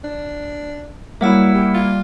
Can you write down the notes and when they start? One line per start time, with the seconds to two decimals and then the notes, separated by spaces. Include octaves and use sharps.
0.04 D4
1.21 F#3 G3 A#3 E4 E5 F#5 E6
1.54 G4
1.74 F4